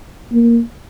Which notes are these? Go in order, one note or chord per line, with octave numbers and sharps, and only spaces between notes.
A#3